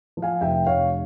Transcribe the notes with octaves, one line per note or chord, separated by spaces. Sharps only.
F3
F5 G#5
F1 E5 G5
F1 C#5 F5